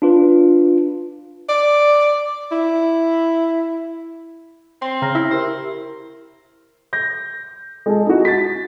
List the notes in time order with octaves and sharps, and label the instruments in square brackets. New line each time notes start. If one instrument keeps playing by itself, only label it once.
[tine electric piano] D4 F4 B4
[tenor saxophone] D5
E4
[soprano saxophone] C4 [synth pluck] C6
[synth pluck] C#3 [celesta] A#5 F6 A#6
[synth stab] E4
[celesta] G4 A#4 [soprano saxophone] C5
[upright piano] G6 A#6
G#3 G#4 A4
D#4 E4 F#4
A6 B6